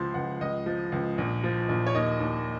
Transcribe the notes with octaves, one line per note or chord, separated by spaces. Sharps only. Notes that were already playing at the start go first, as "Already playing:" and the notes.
Already playing: C#2 F3 C6
C#2 F#5
C#2 D#5
F3
C#2
A#1
F3
A#1
C#5
D#2 D#5
D#2